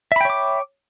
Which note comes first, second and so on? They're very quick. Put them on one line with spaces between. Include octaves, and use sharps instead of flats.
E5 B5 G5 C#5 D6